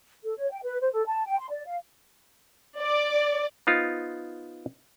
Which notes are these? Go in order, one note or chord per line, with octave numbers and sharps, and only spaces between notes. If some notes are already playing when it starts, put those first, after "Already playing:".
A4
C#5
G5
B4
C5
A4
A5
G5
C6
D5
F5
D5
B3 D#4 F4 C5